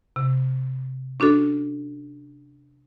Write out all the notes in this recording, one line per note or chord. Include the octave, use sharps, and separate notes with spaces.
C3
C#4 D4 F#4 A4